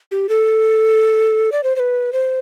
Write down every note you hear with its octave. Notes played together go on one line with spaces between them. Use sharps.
G4
A4
D5
C5
C5
B4
C5